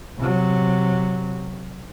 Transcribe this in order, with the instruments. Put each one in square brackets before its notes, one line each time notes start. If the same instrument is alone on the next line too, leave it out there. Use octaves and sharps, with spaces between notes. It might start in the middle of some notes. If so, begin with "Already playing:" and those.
[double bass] C3 F#3